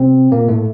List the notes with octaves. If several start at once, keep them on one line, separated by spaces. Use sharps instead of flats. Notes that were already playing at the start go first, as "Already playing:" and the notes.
Already playing: C3 C4
A#2 A#3
A2 A3